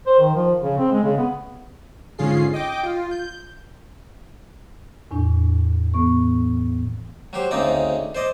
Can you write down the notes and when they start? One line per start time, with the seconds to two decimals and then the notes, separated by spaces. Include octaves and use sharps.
0.07 C5
0.20 D#3
0.36 F3
0.63 C#3
0.78 C4
0.92 G#3
1.04 C#3
1.18 B3
2.18 G#2 D3 C#4 F4 G#4 C7
2.53 D#5 G5 D6
2.83 F4
3.11 G6
5.11 E2 A2 D4
5.94 A2 E3 B3 C#6
7.33 F#3 G4 C5
7.51 D2 C#3 C4 D#4 D5
8.15 C5 D5 D#5